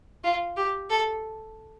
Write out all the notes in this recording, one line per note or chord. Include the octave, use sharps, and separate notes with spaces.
F4
G4
A4